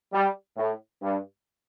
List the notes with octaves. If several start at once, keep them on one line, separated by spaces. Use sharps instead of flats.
G3
A2
G2